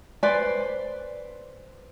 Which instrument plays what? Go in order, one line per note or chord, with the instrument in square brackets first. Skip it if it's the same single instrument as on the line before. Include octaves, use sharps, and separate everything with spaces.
[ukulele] B4 C5 D5 G#5